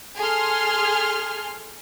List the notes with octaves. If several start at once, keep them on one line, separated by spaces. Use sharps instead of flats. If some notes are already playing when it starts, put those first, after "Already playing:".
G#4 A4 C6 F6